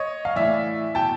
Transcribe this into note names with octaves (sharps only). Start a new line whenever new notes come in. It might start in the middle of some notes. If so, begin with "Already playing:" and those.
Already playing: C#5 D#5
F5
A2 E3 D5 E5
B2 G5 A5